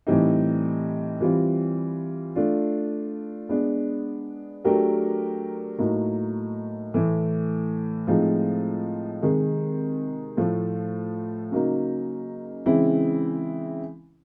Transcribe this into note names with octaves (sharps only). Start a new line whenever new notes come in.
A2 E3 G3 C4 D#4
E3 G3 C4 F4
A3 D4 F4
G#3 B3 D4
F#3 A3 D4 G4 A#4
A2 F#3 A#3 D#4
A2 E3 A3
A2 F3 G#3 C4 D#4
C3 D#3 G#3
A2 F3 A3
C#3 F#3 A#3 D#4
C#3 E3 G#3 C4 E4